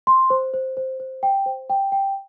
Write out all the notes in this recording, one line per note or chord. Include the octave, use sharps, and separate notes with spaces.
C6
C5
C5
C5
C5
G5
C5
G5
G5